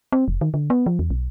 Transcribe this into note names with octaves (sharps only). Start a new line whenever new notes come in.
C4
F1
D#3
D3
B3
F3
E2
B1